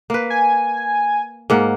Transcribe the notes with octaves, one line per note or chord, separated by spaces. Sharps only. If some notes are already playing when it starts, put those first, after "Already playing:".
A#3 B4
G#5
G#2 A#3 F#5